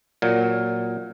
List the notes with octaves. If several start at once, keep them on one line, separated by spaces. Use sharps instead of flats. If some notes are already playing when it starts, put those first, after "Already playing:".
A#2 F#3